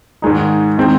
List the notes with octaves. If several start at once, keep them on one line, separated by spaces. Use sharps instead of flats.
G#2 D#3 G#3 D#4
D#3 G#3 C4